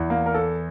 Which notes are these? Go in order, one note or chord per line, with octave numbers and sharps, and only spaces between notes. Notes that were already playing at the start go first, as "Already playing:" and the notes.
Already playing: E2 E3
A#3
A#4
A4